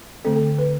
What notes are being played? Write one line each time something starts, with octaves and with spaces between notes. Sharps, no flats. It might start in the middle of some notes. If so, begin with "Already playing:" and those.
D3 A3 C4 A4
A4
B4